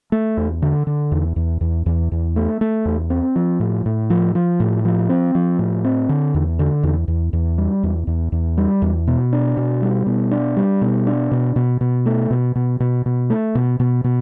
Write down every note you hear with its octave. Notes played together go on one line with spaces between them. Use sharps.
A3
E2
D3
D3
E2
E2
E2
E2
E2
A3
A3
E2
C4
F3
A2
A2
F3
F3
A2
F3
C4
F3
A2
C4
D3
E2
D3
E2
E2
E2
G3
E2
E2
E2
G3
E2
B2
D4
B2
G3
B2
D4
G3
B2
D4
B2
B2
B2
A3
B2
B2
B2
B2
A3
B2
B2
B2